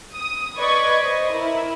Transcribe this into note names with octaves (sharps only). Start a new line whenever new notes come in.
D#6
B4 D5 D#5 B5 C#6 G#6
C5 D#5
E4 A#4